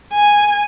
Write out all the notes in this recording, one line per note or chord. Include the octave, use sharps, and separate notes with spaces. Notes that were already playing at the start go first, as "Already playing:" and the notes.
G#5